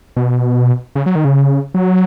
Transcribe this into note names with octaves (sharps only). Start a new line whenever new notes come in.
B2
C#3
F#3
D#3
C#3
F#3